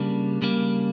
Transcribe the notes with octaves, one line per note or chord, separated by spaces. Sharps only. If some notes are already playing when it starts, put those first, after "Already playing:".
Already playing: C#3 G3 A#3 D4
C#3 G3 A#3